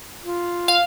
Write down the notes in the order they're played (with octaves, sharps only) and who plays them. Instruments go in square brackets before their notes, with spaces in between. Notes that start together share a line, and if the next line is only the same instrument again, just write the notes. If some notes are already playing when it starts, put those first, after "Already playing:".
[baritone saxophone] F4
[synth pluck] F5